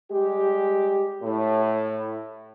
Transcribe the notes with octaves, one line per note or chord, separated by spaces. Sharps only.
G3 G#3 G4
A2